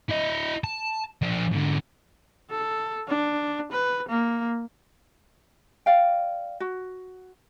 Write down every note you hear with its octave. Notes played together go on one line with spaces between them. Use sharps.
E4 D#5
A5
F3 D4
G#2 D3
A4
D4
B4
A#3
D5 F5 G5
F#4